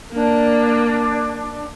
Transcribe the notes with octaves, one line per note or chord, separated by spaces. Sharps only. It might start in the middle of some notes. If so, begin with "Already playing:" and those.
A#3 D4